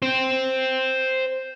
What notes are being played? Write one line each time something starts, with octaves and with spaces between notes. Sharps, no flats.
C5 G5